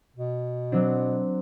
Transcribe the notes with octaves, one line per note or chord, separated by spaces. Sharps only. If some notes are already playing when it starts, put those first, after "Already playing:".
B2
F#3 C4 D4